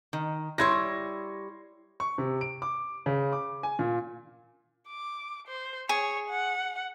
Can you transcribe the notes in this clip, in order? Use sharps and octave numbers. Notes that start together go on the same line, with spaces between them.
D#3
G3 E4 C#5 C6 G#6 A#6
C#6
C3
D7
D6
C#3
D6
G#5
A#2
D6
C5
G#4 C#5
F#5